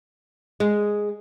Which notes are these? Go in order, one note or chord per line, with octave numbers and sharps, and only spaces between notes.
G#3